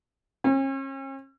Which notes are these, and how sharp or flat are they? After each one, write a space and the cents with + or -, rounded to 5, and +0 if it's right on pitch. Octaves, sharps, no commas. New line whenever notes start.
C#4 -40